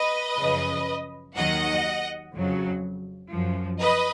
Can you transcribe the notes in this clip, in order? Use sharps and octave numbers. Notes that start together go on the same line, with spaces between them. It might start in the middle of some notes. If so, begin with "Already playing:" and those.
Already playing: B4 D#5
F#2 C#3 F3
D#2 D#3 F#3 D#5 F#5
F2 C#3 F#3
F#2 F3
B4 D#5